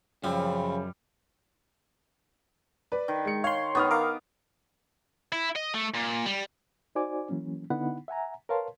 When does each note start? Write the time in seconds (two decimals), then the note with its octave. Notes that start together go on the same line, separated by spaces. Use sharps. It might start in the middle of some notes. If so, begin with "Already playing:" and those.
0.24 F#2 C#3 F3 G3 C4
2.92 B4 D5
3.08 D#3
3.25 G#3 C#7
3.44 C#5 F5 C6
3.75 D#3 B3 C#6 D#6 F6
3.91 A#4 F5 D6
5.33 E4
5.56 D#5
5.74 A3
5.95 A#2
6.26 G3
6.95 D#4 F#4 C5 D5 G#5 D6
7.29 E3 F#3 A#3 C#4
7.70 D3 B3 D#4 E4 F#5 B5
8.08 E5 F#5 G#5 A#5
8.49 A#4 B4 C#5 F5 A5 C6